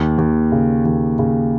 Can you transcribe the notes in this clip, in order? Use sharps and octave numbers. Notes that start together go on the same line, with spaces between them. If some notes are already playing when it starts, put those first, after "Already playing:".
Already playing: D#2
D#2
C#3
D#2
C#3